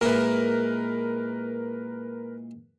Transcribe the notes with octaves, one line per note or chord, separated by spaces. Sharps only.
A#2 G#3 E4 A#4 B4